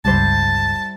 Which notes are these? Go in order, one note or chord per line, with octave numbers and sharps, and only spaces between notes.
G1 C#2 G3 E4 C5 A5